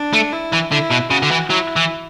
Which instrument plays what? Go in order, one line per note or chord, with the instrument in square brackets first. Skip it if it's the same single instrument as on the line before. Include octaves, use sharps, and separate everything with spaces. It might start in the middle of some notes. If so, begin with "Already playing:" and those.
Already playing: [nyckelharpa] D4
[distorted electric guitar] A3
[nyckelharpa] E4
[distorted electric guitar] E3
[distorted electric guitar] D3 [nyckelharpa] E4
[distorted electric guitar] B2
[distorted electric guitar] C#3 [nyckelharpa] F#4
[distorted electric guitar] D3
E3
[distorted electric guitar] F#3 [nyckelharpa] E4
[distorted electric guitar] E3